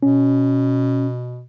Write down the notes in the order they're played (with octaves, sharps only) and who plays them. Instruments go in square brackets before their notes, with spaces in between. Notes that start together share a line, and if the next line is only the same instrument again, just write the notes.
[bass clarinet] B2 [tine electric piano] C#4